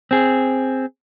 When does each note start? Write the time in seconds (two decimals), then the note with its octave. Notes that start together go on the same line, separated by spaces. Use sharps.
0.11 C4 G#4